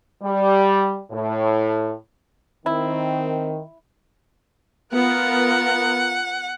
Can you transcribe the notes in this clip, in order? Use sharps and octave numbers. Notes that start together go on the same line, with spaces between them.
G3
A2
D#3 C4 E4
B3 F4 A#4 F#5